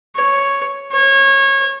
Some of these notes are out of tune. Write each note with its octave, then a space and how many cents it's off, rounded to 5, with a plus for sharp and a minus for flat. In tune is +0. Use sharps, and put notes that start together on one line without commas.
C#5 +0
C#5 -25